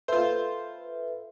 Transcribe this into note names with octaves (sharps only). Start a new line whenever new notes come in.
F4 A4 B4 C5 E5